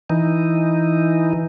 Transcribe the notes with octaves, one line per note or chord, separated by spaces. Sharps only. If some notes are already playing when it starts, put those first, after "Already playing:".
E3 D#4